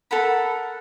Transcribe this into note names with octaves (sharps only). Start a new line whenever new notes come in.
A4 A#4 F#5 B5